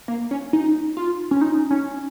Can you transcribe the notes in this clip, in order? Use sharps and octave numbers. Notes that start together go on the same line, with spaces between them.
A#3
C#4
D#4
F4
C#4
D#4
C#4